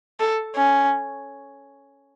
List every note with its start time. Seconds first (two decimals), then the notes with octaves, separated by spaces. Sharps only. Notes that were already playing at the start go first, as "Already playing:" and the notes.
0.20 A4
0.55 C#4